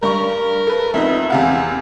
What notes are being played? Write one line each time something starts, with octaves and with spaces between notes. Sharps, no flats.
G2 A#4 C#6
A4 B4
F2 B3 D#4 E5
E2 C3 F5 F#5